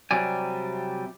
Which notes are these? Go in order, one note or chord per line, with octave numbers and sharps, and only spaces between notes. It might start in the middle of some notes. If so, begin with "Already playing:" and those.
C3 F#3 G3 D5 G#5